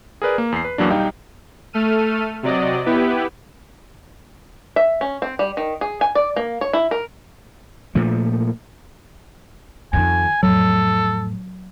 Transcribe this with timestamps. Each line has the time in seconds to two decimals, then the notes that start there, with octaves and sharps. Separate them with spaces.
0.22 G#4 A#4 B4 D5
0.38 A#3
0.52 E2 C7
0.65 B4
0.78 E2 F#3 A#3 D4
0.90 B1 G3 D#4 F5 G5
1.73 A3 A4 F6 D#7
2.43 C3 F#3 D5 D#5
2.86 B3 E4 G4 B4
4.76 E5
5.01 C#4
5.22 C4
5.39 G3
5.57 D#3
5.81 G#4
6.01 G#5
6.15 D5
6.36 A#3
6.61 C#5
6.73 E4
6.91 A#4
7.95 A#2 F3 A3
9.93 F2 D#3 G#5
10.43 F2 A2 F#3 A4